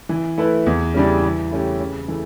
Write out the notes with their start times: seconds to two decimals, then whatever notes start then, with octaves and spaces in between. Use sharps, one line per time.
0.09 E3
0.38 A3 E4 B4
0.66 E2
0.94 C#3 E3 G3 D4
1.23 E3
1.52 A3 C#4 G4
1.80 C#3
2.08 E3 A3